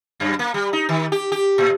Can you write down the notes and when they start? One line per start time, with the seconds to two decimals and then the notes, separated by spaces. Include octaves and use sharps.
0.20 F#2
0.39 A#3
0.54 G3
0.73 D#4
0.89 D#3
1.12 G4
1.32 G4
1.58 A2